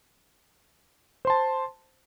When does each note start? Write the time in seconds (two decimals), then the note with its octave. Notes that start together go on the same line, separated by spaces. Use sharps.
1.25 C5
1.27 C6
1.30 A5